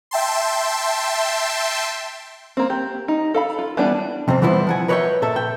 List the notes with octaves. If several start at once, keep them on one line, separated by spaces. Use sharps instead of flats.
E5 G5 A5 C6
A#3 C4
G4
D#4
A4 F5 B5
F4
E3 G3 B3 D4 B4
F2 C3 F3 C4
E3 G3 B3 E4 F4 C5
F3 F#5 G#5
A#4 B4 C#5 D5 E5 G5
A#2 A4 E5
G5